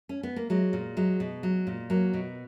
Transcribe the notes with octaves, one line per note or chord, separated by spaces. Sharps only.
C#4
B3
A#3
F#3 G#3
A#2
F#3 G#3
B2
F#3
A#2
F#3 A#3
B2